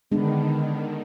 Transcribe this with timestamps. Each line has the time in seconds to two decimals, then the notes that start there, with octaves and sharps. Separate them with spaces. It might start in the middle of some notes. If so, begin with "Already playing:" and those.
0.12 D3 D#3 G#3 B3 D4